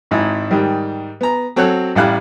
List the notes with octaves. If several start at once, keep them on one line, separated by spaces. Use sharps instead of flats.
G#1 G#2 E4
G#2 D#3 G3
B3 A#5
F#3 C4 A4 C#5 F#5 F#6
A1 G3 E4 F5 F#6